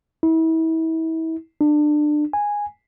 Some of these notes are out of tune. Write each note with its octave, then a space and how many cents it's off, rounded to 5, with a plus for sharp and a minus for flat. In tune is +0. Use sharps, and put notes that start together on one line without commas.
E4 -35
D4 +25
G#5 -10